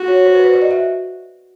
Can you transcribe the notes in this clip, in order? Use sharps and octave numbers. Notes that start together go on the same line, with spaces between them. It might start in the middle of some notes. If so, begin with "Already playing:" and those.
Already playing: F#4
C#5
C5
B4
C5
D5
D#5
E5